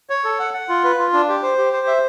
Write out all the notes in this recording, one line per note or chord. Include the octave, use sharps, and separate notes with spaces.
C#5
A4
F#5
F#5
F4
B4
F4
D4
G4
C5
G4
C5
E5